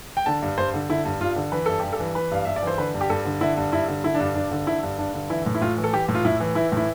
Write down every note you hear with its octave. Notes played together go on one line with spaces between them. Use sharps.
G5
D3 A5
G2
G2 C5
D3
D3 E4
G2
G2 F4
D3
E3 B4
G2 A4
G2 G4
A4
E3
E3 B4
G2 F5
G2 E5
D5
E3 C5
D3 B4
G2
G4
G2 A4
D3
D3 E4
G2
G2 E4
D3
D3 E4
D4
G2
G2 D4
D3
D3 E4
G2
G2 D4
D3
E3 E4
A2
E4
A2 F4
E3
A4
E3 G4
A2
F4
A2 E4
E3
E3 E4
A2 E4